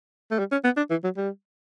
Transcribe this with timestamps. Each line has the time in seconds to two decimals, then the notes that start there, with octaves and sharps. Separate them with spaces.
0.31 A3
0.39 G3
0.51 C#4
0.64 B3
0.77 D4
0.90 E3
1.04 F#3
1.17 G3